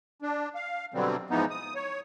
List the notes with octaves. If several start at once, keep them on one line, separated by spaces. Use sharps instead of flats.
D4
F5
B2 D3 E3 F#3 G3 C4
G#2 E3 F3 B3 D#4
D#6
C#5